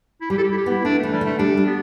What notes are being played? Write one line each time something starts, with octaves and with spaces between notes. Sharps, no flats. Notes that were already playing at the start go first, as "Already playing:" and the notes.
E4
G3 G4
A4
G4
E4
G4
B3 E4
A3 D4
E3 A3
G3
D3 A3
G3 D4
G3
B3